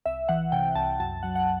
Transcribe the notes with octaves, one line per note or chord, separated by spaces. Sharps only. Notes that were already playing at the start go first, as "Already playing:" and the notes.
C2 E5
E3 F#5
C3 G5
C2 A5
F#2 A5
F#3 F#5
F#5